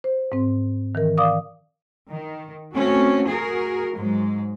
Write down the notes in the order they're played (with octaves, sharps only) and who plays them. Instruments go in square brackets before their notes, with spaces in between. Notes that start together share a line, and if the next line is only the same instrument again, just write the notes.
[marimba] C5
G#2 C4
D#3 E3 A#4
D5 F5 D6 D#6
[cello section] D#3
A3 C4 C#4 F#4
F#4 G#4 A#4
G#2 F#3 G#3